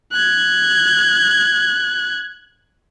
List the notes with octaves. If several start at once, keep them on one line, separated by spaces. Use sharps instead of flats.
F#6 G#6